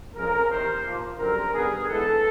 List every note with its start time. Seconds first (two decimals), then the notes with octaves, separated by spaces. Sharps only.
0.14 F2 C#3 F3 G#3 C#4 A#4
0.49 E2 C3 D#3 C5
0.83 A#2 F3 A#3
1.18 F#2 D3 G3 C4 A#4
1.53 G2 D#3 G3 B3 G#4
1.87 G2 E3 G#3 B3 A4